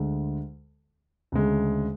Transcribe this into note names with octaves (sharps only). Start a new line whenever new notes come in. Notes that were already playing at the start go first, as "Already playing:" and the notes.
Already playing: D2 D3 G#3
D2 C#3 G#3